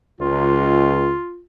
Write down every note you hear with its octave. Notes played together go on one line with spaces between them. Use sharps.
C#2 F4